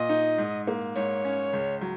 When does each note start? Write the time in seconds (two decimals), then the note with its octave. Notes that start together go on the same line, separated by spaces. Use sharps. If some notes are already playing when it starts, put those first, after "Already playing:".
Already playing: A#2 D#5
0.09 D#4
0.38 G#2
0.67 A#3
0.95 G#2 C#5
1.25 C#4
1.53 C#2
1.81 F#3